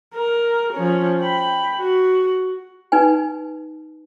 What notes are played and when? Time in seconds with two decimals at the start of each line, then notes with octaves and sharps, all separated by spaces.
0.14 A#4
0.73 F3 C#4
1.21 G5 B5
1.77 F#4
2.92 D#4 B4 G#5